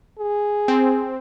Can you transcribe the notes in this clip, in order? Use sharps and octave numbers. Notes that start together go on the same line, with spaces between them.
G#4
C4